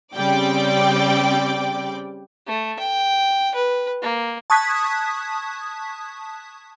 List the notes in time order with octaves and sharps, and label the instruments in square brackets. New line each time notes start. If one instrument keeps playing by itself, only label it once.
[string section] C#3 G3 C4 D5 G5 D6
[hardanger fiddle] A3
G5
B4
A#3
[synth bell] A5 C#6 D#6 F#6 G#6 B6